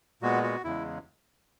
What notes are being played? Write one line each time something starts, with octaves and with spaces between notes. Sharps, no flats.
A#2 G#3 B3 F#4
F#4
E2 C#3 G#3 E4